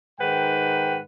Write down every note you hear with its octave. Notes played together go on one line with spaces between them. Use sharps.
G#2 D#3 B4 F#5 G5